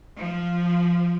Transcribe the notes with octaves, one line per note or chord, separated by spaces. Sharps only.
F3